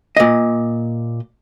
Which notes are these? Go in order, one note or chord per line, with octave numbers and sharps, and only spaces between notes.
A#2 D#5